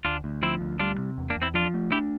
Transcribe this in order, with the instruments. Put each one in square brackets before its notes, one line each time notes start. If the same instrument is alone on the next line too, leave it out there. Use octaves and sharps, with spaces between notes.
[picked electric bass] D2 [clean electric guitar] D4 F4
[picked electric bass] D2
[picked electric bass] F3 [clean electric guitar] C4 E4
[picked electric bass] D2
[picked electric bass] G3 [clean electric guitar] D4 F4
[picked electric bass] C3
E2
[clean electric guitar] A#3 D4
[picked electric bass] E2
[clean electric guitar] C4 E4
[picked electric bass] F3 [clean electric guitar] D4 F4
[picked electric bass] A3
[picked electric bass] D4 [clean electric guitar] E4 G4